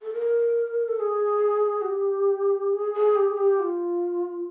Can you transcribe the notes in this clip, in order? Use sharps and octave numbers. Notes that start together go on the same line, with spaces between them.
A4
A#4
A4
G#4
F#4
G4
G#4
G#4
G4
G#4
G4
F4